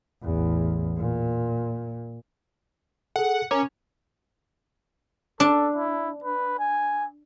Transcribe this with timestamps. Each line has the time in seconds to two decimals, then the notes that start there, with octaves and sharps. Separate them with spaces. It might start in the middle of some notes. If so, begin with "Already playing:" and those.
0.22 A1 E2
0.98 A#2
3.16 G#4 A4 F#5
3.51 C#4 A#4 A#5 D6
5.40 D4 A4
5.76 E4
6.24 B4
6.59 G#5